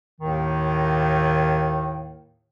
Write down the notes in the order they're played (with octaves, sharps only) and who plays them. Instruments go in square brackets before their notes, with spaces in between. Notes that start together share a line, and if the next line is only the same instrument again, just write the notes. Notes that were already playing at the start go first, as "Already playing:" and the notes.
[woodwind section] D#2 A2 D#3